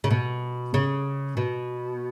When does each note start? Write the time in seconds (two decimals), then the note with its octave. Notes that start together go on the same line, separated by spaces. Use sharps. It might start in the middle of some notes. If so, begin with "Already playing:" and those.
0.04 C#3
0.10 B2
0.74 C#3
1.37 B2